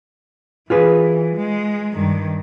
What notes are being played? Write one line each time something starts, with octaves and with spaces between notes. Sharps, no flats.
E3 F4 G#4 B4
G#3
G2 D#3